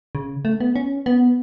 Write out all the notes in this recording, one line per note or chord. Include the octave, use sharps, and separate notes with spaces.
C#3
A3
B3
C#4
B3